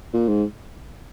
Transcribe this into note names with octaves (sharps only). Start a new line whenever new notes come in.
A#2
G#2